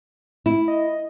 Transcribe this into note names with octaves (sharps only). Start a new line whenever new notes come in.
E4
D#5